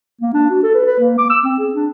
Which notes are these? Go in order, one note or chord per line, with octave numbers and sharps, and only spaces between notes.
A#3
D4
F#4
A4
B4
B4
A#3
D6
E6
C4
G#4
D4